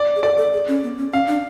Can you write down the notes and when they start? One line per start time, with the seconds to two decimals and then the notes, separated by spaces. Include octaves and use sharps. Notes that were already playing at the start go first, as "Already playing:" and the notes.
Already playing: D5
0.16 G#4
0.23 A4 D5
0.38 A4
0.53 G#4
0.68 C#4
0.83 B3
0.98 C#4
1.13 C#4 F5
1.28 D4